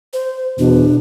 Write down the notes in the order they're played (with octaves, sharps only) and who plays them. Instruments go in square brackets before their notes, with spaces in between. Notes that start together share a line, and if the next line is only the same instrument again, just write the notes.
[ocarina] C5
[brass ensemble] E2 B2 [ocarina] D4